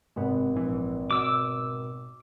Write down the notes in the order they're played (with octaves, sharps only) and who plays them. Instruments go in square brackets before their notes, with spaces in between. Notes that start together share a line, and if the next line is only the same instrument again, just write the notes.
[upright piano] G#1 [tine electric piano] C3 B3
[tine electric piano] A#1 E3
[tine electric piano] B2 [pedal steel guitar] D6 E6